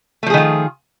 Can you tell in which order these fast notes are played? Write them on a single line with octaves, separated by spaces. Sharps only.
A3 F3 G#4 D#3 F4